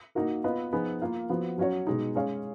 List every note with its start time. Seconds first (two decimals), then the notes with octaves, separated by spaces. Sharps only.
0.15 A#3 D#4 F#4 A#4
0.44 B3 F4 B4 D#5
0.73 F3 B3 D#4 G#4
1.01 A#3 F4 A#4 F5
1.29 F3 B3 F#4
1.58 F#3 C#4 F#4 C#5
1.87 B2 G#3 D#4
2.15 G#3 C#4 G#4 C#5 F5